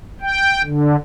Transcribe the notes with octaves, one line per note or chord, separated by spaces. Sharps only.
G5
D3